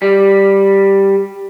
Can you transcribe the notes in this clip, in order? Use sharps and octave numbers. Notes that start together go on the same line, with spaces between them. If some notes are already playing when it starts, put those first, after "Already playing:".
G3